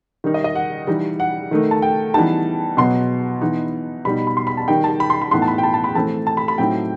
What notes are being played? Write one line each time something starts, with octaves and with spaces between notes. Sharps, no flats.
D#3 G3 D#4
D#5
D#5
F#5
E3 G3 D#4
F#5
D#3 A3 D#4
A5
G5
E3 G3 B3 D#4 A5
B2 F#3 B3 C6
E3 B3 D#4
B2 G3 D#4 B5
B5
C6
B5
A5
D#3 G3 D#4 G5
A5
B5
C6
B5
A2 E3 B3 D#4 C6
A5
B5
G5
A5
A5
B5
E3 A3 C4 A5
A5
B5
B5
A2 F#3 C4 D#4 G5